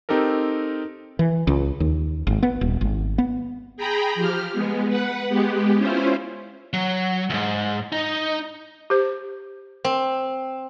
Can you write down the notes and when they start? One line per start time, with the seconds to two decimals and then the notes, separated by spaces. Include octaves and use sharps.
0.09 C4 D#4 G4 A4 A#4
1.19 E3
1.47 C#2
1.80 D#2
2.27 G#1
2.43 B3
2.61 D#1
2.81 G#1
3.18 B3
3.76 G#4 G5 A#5 B5
4.15 F3 G4 F6
4.52 G#3 B3
4.88 B4 F#5
5.29 G#3 B3 G4
5.77 C#4 E4 F4 C5
6.73 F#3
7.30 D2 G#2
7.92 D#4
8.90 G4 C5
9.84 C4